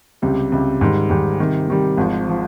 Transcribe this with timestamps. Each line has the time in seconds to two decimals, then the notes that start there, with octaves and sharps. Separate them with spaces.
0.22 C#2 C3 G3
0.52 C#2 C3 G3
0.81 G#2 D#3 G3
1.10 G#2 D#3 G3
1.39 C3 D#3 G3
1.68 C3 D#3 G3
1.97 G#1 G#2 F3
2.29 F3